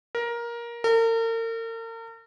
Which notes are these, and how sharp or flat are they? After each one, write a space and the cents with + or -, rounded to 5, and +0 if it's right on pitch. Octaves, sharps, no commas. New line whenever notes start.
A#4 +15
A#4 -40